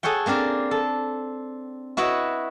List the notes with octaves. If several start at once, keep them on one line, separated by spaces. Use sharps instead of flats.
G#4 A4 C#5 F#5 G5
A#3 C4 D4 A#4 D5
A4
E4 F#4 B4 C#5 D#5 E5